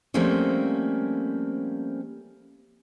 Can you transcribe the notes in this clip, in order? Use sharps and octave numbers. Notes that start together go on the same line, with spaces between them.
F3 G3 A3 A#3 C4 C#4